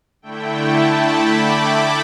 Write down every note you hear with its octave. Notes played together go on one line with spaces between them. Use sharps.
D3 A3 E4 G5
A5
B5
D6
B5